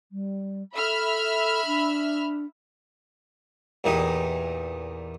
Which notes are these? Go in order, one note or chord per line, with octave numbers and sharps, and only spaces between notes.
G3
A4 E5 B5 F6
D4
E2 A#2 E3 D#4 G4